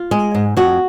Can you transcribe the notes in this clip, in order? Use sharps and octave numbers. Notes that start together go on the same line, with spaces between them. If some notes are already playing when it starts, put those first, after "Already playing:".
Already playing: F4
G#3
G#2
F2 F#4